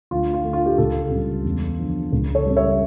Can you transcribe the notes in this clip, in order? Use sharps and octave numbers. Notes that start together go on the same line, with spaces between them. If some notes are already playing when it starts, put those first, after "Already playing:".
D2 F4
F4
D3 A3
F4
G4
C#2 F4 A4
C#3 G3
E2
D3 F3
C#2
A4 C#5
C#3 G3
C#5 E5